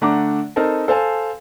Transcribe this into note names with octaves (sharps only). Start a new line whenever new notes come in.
D3 A3 D4 F#5 A#5 D6
C4 D#4 A4 A#4 A5
A4 C5 F5 G#5 A5